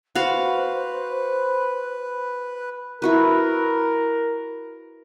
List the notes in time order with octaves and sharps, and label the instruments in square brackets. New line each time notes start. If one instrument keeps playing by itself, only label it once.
[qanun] F#4 F5 [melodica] B4 [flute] C5
[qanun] E4 F#4 B4 [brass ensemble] A#4